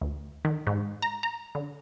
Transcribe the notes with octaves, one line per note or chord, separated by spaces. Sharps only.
D2
D#3
G#2
A#5
A#5
D3